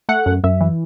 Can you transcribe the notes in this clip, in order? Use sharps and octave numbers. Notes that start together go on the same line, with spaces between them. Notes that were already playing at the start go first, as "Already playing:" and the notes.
A3 F#5
F#2
F#2 E5
E3